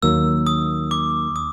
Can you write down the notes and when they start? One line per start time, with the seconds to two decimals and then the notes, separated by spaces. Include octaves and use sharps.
0.02 D#2 D#3 F#3 A#3 E6
0.47 D#6
0.91 D6
1.36 D#6